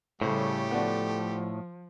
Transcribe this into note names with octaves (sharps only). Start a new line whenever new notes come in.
A2 C#3 G3 A3 G4 C5
F3 B3 D4 F#4